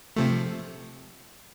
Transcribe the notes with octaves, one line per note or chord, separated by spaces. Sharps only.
C3 F3 A3